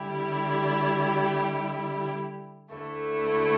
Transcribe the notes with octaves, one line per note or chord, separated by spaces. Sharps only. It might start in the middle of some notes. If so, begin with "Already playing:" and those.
Already playing: D3 G3 E4 G4
D2 D3 A3 E4